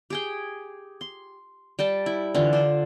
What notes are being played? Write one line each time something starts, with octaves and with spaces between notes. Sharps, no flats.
G4 G#4 G5
C6
G3 G5 A5
E4
D3 E3 F4
D4 C5